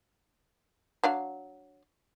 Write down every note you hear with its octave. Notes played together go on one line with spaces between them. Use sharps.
F#3 D4 F5